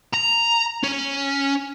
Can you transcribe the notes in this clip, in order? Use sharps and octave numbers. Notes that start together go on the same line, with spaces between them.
A#5
C#4